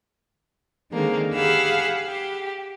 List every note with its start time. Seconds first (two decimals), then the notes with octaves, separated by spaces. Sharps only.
0.91 D3 D#3 G#3 A#3 C4
1.33 G4 G#4 F5 F#5 B5 E6
2.06 G4